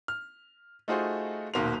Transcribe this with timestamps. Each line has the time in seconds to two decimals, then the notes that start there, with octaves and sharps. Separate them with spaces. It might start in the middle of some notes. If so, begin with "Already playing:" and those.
0.08 F6
0.88 A3 D#4 F4 F#4 G#4 C5
1.54 D#1 B1 A#3 F#4 C6 F7